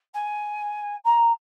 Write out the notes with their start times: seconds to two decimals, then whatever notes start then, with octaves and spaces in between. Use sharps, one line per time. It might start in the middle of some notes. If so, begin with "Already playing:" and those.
0.14 G#5
1.04 A#5